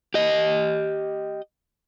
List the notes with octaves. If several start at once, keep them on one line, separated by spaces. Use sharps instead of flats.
G4 D#5